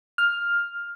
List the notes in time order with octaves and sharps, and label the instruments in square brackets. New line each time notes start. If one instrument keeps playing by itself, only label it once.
[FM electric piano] F6